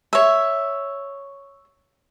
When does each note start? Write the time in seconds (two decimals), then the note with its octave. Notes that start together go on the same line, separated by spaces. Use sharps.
0.13 C#5 E5